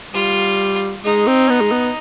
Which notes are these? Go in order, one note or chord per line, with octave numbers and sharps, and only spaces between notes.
G3 F4
G#3 D#4
C4
B3
G#3
B3